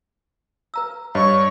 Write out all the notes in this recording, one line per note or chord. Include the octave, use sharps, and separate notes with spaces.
B4 A#5 E6
G2 C#5 D#5 C#6